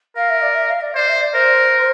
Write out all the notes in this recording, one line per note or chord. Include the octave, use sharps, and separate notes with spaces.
A#4 F5
E5
D5
E5
F5
D5
C5 D5
E5
D5
A#4 C5